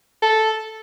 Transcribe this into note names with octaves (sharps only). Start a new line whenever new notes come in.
A4